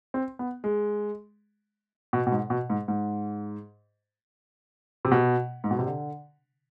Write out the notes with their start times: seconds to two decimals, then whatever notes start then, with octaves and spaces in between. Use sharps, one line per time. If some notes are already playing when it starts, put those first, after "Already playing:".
0.14 C4
0.39 B3
0.64 G#3
2.13 B2
2.27 B2
2.32 G#2
2.50 B2
2.70 G#2
2.88 G#2
5.05 C3
5.11 B2
5.64 G#2
5.71 B2
5.79 C3
5.86 D3